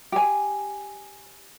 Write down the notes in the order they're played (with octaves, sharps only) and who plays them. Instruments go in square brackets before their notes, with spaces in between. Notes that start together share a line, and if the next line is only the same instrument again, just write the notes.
[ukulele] G4 G#5